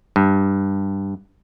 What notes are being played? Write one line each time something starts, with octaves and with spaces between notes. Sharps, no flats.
G2